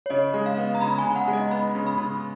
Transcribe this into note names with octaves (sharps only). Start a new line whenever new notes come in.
C#5
C#3 D#5
G#3
F5
B3
A#5
C#3 B5
G#5
C#3
G#5
F#5
G#3
D#5
B3 B5
C#3
B5
C#3